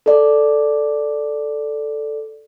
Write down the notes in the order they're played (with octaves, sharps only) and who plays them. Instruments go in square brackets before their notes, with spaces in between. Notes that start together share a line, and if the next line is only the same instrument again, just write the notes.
[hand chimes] A4 D5